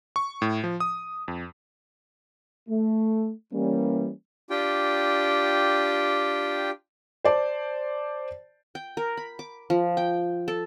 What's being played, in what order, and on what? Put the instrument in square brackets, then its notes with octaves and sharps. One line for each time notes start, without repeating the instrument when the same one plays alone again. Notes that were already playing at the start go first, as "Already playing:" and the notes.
[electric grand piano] C#6
A2
F3
D#6
F2
[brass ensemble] A3
E3 G3 A#3 C#4
[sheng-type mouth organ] D4 F4 G4 G5
[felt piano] C5 D5 A5
[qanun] G5
A#4
B5
D6
F3
G5
A4